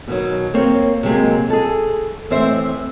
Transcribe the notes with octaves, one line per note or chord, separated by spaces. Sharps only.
B2 D#3 F#3
A#3 C4 C#5
C3 F#3 G#3 A#3
G#4 A4
A2 E3 C4 C5 E5